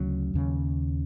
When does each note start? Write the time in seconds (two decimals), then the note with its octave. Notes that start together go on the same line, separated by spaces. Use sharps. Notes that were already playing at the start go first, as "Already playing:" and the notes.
Already playing: D2 C#3 F#3
0.34 D#2 C#3